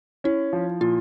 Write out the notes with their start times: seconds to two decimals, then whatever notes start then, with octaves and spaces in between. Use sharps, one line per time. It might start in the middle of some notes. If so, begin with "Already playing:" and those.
0.24 C#4 E4
0.53 F3
0.81 A#2 F4